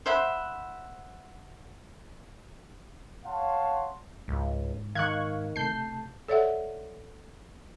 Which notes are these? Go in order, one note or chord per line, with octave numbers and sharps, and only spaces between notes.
C5 E5 F#5 B5
C#5 F5 F#5 A5 C6
C#2 G#2
D#3 F5 C#6 F6 F#6 G#6
C3 A3 A5 G6 C7
A4 C#5 D5 E5 F#5